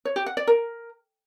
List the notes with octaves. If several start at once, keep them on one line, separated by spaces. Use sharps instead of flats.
C#5
G4
F#5
D5
A#4